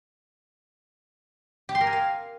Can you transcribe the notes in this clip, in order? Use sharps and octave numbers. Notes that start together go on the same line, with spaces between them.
G4
C6
A#4
G#5
F5